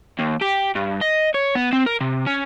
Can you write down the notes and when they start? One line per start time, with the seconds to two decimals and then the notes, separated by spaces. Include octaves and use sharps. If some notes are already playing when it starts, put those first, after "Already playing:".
0.19 D#2
0.41 G4
0.75 G2
1.01 D#5
1.34 C#5
1.55 B3
1.73 C4
1.86 A#4
2.01 C3
2.27 C#4